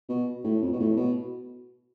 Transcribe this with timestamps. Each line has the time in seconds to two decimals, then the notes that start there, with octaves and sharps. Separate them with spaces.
0.09 B2
0.44 A2
0.62 F2
0.72 B2
0.79 A2
0.97 B2